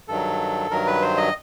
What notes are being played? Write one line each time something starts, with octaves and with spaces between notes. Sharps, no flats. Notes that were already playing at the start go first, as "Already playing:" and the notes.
G2 D#3 F#3 A4
G2 D#3 F#3 A#4
B4
C5
D#5